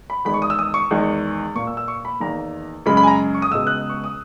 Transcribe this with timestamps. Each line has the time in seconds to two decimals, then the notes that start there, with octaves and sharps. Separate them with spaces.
0.10 B5
0.25 E2 D#3 G#3 B5
0.34 C#6
0.42 D#6
0.50 E6
0.59 D#6
0.74 C#6
0.91 E2 D#3 G#3
1.55 A#2 A#3 C#6
1.67 E6
1.77 E6
1.88 C#6
2.05 B5
2.20 E2 D#3 A#3 A#5
2.86 F#2 C#3 G#3 B5
2.97 B5
3.03 G#5
3.07 A#5
3.34 C#6
3.42 D#6
3.50 C#2 B2 G#3 E6
3.67 F#6
3.89 C#6
4.04 D#6